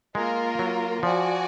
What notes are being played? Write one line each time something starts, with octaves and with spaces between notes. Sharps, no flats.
G#3 A#3 F4 A#4
F#3
F3 F#4 D5 G#5